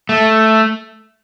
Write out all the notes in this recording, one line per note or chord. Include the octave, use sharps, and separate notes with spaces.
A3